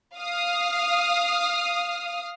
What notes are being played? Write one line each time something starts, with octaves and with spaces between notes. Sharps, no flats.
F5 D#6 F6